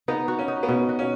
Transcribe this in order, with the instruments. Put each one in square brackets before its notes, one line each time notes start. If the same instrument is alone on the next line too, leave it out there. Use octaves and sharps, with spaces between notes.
[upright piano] B3 [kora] D#4
[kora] F#4
[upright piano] C#4
[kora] D#4
[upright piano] B3
[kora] B2 [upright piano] C#4
[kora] F#4
[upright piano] C#4